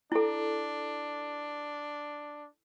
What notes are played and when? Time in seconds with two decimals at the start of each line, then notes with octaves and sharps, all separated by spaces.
0.12 D4 E4 A4